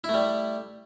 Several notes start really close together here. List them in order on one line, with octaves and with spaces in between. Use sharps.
E4 A3 G3